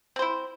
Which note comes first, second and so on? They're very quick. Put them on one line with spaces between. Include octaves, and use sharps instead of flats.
C4 C5 E4